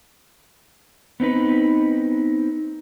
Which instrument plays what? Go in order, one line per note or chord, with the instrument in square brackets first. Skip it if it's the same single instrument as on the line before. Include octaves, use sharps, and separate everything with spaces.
[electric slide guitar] B3 C4 D#4 B4